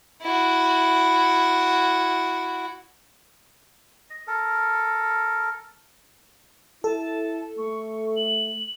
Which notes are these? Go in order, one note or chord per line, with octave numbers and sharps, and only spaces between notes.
E4 F#4
D#5
A4 A#4
E4 A4 A5
A3 C#6
F#7